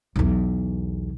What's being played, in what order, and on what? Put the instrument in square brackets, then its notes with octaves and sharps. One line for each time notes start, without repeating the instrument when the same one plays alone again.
[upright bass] B1 E2